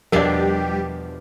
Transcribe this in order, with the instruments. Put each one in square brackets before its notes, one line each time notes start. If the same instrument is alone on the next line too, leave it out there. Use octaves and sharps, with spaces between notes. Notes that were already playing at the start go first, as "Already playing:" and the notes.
[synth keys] E2 F3 [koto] B2 D4 [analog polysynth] G3 G4 [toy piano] A#4 D5